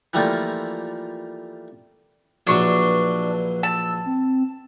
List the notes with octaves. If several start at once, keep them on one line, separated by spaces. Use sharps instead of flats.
E3 F3 G3 A3 A#3 F4
A#1 E3 F#3 D4 B4 C#6
A5 E6
C4